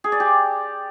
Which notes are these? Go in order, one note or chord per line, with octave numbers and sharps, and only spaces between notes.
G#4
D5
G4